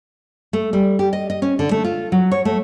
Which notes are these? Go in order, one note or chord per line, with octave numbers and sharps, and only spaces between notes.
A3
G3
G4
D#5
D#5
C#4
D3
A3
F4
F#3
C#5
A3